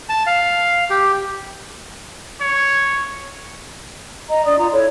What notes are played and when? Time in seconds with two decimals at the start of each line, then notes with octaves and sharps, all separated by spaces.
0.09 A5
0.27 F5
0.90 G4
2.41 C#5
4.29 D#5 A#5
4.45 D4 D5 D#6
4.57 F4 A#5
4.72 E4 A4 C#5